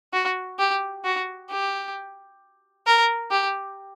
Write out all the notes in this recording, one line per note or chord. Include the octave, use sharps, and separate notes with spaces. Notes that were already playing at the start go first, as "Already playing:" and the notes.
F#4
G4
F#4
G4
A#4
G4